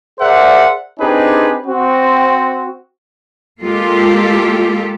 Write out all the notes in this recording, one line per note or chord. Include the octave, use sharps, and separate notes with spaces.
G#4 A#4 C5 D5 E5 F#5
C4 D4 D#4 G4 G#4 B4
C4 F#4
G#3 A#3 F4 G4 A4